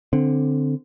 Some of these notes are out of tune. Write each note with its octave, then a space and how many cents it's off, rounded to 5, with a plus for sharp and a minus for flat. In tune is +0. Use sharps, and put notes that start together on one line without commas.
D3 +0 C4 +0